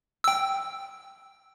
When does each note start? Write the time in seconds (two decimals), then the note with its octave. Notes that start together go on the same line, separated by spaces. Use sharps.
0.24 G5 E6